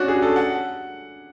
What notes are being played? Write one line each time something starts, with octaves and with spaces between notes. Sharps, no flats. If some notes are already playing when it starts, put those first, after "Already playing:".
Already playing: C#4 D4 F#4
G#4
A4
F#5